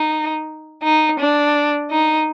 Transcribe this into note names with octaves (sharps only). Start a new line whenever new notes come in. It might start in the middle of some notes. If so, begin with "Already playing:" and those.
Already playing: D#4
D#4
D4
D#4